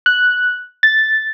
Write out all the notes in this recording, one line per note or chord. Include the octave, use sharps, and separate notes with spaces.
F#6
A6